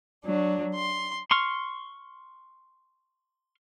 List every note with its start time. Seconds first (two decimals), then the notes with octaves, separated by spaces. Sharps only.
0.25 F#3 D4
0.76 C6
1.31 C6 C#6 F6